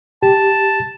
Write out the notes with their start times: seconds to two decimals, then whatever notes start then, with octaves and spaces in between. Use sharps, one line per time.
0.23 G4 A5